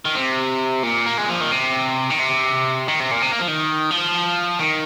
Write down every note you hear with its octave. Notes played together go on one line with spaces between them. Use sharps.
D#3
C3
A#2
A#3
G#3
F3
D#3
C3
D#3
C3
D#3
C3
A#2
C3
A#3
F3
D#3
F3
D#3